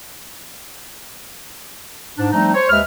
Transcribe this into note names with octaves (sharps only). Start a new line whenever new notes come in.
G#2 D4
F3 G3 A3 C4 D#4
C5 C#5
D#2 G#3 B4 E5 F6